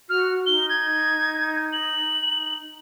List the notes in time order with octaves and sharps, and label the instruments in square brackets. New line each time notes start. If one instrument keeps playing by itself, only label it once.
[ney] F#4 [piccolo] F6
[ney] D#4 [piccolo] G7
[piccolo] G#6
F#7